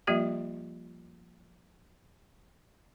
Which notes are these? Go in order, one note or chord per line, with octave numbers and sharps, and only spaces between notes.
F3 G3 A#3 F4 G4 E5